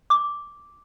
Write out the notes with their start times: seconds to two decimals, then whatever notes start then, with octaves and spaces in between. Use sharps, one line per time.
0.10 D6